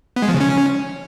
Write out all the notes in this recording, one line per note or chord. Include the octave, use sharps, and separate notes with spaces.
B3
G#3
F3
C#3
C#4